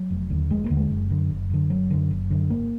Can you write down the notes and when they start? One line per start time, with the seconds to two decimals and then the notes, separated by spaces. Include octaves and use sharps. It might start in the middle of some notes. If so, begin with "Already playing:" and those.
Already playing: F#3
0.10 F1
0.30 D#2 D3
0.50 F1 G#3
0.64 A#3
0.70 D#2 D3
0.77 G#3
0.90 F#1
1.10 F#2 D3
1.30 F#1
1.50 F#2 D3
1.70 F#1 F#3
1.90 F#2 D3
2.11 F#1
2.31 F#2 D3
2.50 G#1 A#3